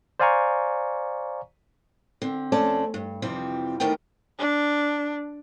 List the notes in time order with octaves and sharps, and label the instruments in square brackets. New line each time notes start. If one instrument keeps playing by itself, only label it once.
[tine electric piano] C5 D5 F5 G#5 A#5 C#6
[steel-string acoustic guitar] D3 C4
F2 A3 C4 C#4 D5 A5
G2
F2 C3 E3 F3 G3 C4
D3 D#3 A3 B3 A#4 G5
[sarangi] D4